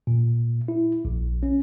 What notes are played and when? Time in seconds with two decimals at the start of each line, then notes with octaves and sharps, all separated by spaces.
0.07 A#2
0.68 E4
1.05 A#1
1.43 C#4